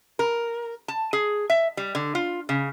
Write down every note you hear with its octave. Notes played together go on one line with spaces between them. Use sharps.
A#4
A5
G#4
E5
G3
D3
F4
C#3